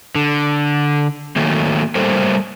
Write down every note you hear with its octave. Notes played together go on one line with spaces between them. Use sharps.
D3
D#3 F#3 A3 A#3
G3 A3 A#3 A4 C5